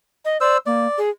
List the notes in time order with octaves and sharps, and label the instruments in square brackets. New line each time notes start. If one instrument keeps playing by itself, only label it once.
[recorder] D#5
[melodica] C5 E6 [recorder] D5
[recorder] A#3 [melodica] D5
[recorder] G#4